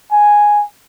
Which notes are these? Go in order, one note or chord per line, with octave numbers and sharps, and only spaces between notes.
G#5